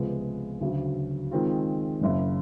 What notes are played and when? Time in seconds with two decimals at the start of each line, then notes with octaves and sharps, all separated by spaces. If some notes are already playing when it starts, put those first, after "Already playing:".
Already playing: C#2 C3 F3 G#3 B3
0.61 D2 C#3 F#3
1.31 D#3 G#3 C4 F4
2.01 F#1 F#2 C#3